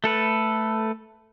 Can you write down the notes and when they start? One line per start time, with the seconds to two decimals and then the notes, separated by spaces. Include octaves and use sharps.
0.04 A3 A4 B4